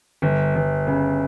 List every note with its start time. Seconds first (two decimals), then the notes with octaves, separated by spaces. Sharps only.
0.22 G1
0.55 G1
0.87 C#3